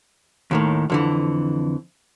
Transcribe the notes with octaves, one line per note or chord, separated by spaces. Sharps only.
D#2 A2 D#3
F2 D3 E3